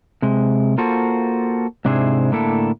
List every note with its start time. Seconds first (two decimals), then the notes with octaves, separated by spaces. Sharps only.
0.22 C3 G#3
0.78 A#3 F4 F#4 A4 C5
1.85 G#2 C3 D4 E4 G#4 C5
2.32 A2 D3 A#3 E4 A4